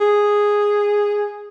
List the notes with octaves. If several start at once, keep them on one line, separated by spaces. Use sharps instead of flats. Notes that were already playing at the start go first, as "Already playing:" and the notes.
G#4